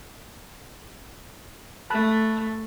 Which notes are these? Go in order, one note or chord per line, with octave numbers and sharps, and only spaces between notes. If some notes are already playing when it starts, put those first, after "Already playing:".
A3 A5 B5 F#6